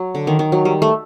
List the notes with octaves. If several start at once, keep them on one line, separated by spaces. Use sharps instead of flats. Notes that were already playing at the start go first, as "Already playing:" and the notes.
Already playing: F#3
D3
D#3
D#3
F#3
G3
A3